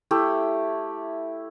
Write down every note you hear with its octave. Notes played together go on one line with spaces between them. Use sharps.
A3 E4 G4